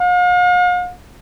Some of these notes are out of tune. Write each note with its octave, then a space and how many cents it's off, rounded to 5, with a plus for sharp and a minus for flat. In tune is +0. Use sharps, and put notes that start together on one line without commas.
F5 +45